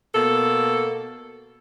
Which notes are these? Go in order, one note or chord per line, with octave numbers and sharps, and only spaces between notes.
B2 A#3 A4